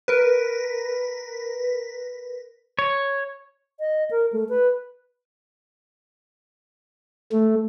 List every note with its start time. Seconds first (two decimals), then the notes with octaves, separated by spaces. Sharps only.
0.08 A#4 B4
2.79 C#5
3.80 D#5
4.11 A#4
4.33 A3
4.49 B4
7.32 A3